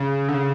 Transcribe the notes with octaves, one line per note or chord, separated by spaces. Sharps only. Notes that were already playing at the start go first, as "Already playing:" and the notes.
Already playing: C#3
D3
C#3